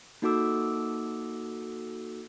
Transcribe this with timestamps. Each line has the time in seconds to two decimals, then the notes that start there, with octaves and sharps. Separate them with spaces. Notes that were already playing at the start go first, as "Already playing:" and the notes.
0.22 A#3 D#4 F#4 A4 D6 E6